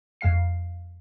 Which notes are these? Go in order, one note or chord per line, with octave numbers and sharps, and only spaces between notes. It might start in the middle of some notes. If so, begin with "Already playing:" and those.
F2 G#3 F5 C7